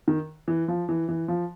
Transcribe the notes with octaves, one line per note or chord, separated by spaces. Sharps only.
D#3
E3
F3
E3
E3
F3